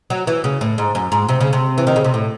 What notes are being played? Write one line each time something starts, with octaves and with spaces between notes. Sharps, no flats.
F#3
E3
C#3
A2
G#2
F#2
G#2
C3
C#3
C3
E3
D#3
C#3
C3
A2